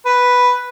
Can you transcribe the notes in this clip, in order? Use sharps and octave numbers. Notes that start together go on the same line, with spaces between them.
B4